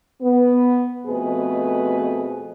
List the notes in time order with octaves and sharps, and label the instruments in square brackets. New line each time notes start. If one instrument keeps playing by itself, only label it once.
[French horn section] B3
F2 B2 A3 G#4 B4